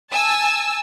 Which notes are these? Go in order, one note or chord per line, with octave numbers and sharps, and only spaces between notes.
G#5 A5 E6